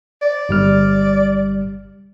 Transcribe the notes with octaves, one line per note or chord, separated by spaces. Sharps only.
D5
G1 G3 F6